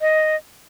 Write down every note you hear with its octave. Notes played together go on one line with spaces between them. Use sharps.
D#5